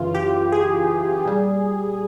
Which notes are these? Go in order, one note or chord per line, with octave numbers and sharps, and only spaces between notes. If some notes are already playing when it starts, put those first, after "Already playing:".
Already playing: F#2 C#3 E3 F4
G4
G#4
A#2 G3